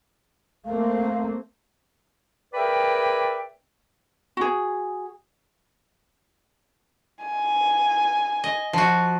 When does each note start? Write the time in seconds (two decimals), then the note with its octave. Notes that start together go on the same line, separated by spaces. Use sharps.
0.65 A3 A#3 C4 F5
2.54 G#4 A#4 B4 D5 E5 G5
4.37 F#4 G#4
7.24 G#5
8.44 D#5
8.73 F3 F#4